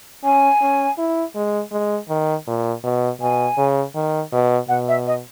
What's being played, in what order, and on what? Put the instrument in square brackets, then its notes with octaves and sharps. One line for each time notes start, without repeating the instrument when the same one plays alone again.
[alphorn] C#4 [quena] G#5
[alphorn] C#4
E4
G#3
G#3
D#3
A#2
B2
[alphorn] B2 [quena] G#5
[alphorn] C#3
D#3
B2
[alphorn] B2 [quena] F#5
[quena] E5
D#5